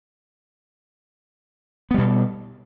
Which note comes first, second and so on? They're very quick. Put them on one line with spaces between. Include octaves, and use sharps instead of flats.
B3 G3 B2